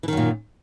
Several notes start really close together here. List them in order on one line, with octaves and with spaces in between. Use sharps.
E3 D#3 F#2 A#2